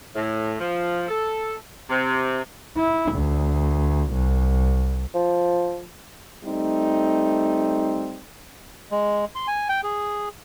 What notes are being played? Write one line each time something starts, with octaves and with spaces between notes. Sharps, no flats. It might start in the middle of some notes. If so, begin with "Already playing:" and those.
A2
F3
A4
C3
E4
D2
C2
F3
G3 A3 C4 D#4
G#3
C6
G#5
G5
G#4